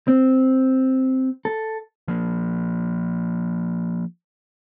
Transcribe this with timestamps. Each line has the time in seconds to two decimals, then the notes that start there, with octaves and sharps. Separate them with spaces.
0.08 C4
1.45 A4
2.08 F3 A#3